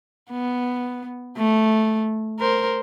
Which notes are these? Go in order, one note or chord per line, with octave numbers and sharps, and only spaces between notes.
B3
A3
A#4 C5